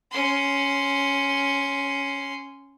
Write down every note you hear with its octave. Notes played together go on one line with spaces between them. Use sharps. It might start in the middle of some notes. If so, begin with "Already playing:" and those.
C#4 C6